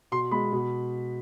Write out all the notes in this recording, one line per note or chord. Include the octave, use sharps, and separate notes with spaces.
B2 C6
G#3 B5
B2